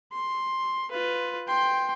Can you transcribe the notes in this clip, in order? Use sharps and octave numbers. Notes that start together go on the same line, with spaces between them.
C6
F4 B4
G5 C6